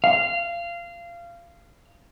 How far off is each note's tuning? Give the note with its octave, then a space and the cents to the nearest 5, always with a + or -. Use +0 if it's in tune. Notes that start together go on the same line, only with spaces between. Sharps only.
F5 -20